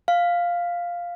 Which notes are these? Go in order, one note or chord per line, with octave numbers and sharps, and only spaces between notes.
F5